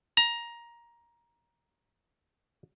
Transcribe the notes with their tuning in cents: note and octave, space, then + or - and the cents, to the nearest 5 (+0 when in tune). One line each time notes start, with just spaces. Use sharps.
A#5 +15